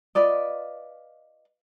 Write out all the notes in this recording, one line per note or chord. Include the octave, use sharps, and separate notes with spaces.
F4 B4 D5 D#5